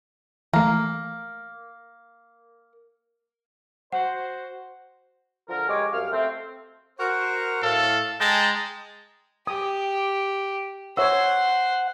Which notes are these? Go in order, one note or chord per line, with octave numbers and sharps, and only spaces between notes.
E3 A3 A#3
F#4 C5 F#5
D3 F3 A#4
G#3 G4 C#5 G#5 D6
C2 F#2 F5 F6
A3 C4
F#4 A#4 C5
A2 A4 F5
G#3 G5 A5 A#5
G4 D#6
C5 C#5 E5 F#5 E6